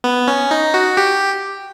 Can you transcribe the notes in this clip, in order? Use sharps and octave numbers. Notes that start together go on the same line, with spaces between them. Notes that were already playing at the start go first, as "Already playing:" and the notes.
B3
C#4
D#4
F#4
G4